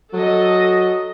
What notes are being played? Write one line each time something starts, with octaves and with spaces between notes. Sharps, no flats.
F#3 A4 D#5